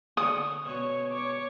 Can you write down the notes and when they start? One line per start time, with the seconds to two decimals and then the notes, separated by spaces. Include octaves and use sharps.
0.17 D3 C#5 D#6
0.65 B2 C#4 C#5
1.11 C#5 D6